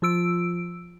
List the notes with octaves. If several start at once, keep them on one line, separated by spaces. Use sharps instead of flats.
F3 F4 E6 D7